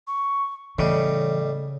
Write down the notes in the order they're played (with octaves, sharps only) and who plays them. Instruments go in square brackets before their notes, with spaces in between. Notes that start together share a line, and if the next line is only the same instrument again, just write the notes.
[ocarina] C#6
[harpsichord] A2 G3 [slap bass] C#3 [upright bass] E3 [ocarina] D#5